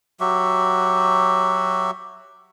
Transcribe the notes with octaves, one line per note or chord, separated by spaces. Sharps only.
F#3 F#4 G4 E5